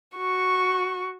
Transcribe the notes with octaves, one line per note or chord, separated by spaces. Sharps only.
F#4 C#6